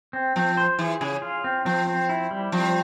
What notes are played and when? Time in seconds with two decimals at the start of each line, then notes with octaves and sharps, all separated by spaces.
0.13 C4
0.36 F3 C4
0.57 C5
0.79 E3 G#4
1.01 C#3 G#4
1.22 F4
1.44 C4
1.65 F3 C4
1.87 C4
2.09 E4
2.31 G3
2.52 F3 C4